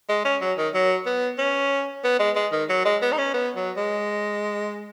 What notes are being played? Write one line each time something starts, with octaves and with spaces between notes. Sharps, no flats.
G#3
C#4
F#3
D#3
F#3
B3
C#4
B3
G#3
G#3
D#3
F#3
G#3
B3
D#4
C#4
B3
F#3
G#3